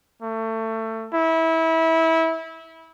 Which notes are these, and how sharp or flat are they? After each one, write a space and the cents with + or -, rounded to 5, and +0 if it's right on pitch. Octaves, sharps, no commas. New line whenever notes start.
A3 +25
E4 -20